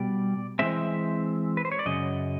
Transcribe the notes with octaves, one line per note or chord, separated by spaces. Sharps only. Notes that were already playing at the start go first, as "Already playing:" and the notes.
Already playing: B2 G3 D5
E3 G#3 C4 E5
B4
C5
C#5
D5
F#2 C#3 D#5